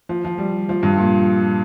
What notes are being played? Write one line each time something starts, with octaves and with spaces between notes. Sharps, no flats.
F3
F3
G3
F3
G2
A#2